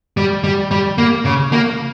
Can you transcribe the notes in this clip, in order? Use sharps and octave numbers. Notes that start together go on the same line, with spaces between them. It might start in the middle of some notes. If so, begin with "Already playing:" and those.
G3
G3
G3
A#3
C#3
A#3